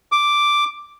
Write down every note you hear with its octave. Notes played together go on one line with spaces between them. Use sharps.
D6